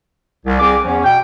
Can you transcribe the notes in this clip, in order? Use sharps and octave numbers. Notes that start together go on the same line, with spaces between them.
C2
C2 C4 G#4 D6
E2 F3 C#4
B2 G5